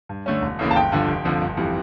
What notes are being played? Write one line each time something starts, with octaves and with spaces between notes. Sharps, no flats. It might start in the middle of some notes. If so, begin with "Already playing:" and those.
G2
D3 A3 C#4
E1
D2 C#3 E3 A#3
A5
G1 G5
G2 D3 F3
F1
F2 D3 F3
G1
F2 E3 G3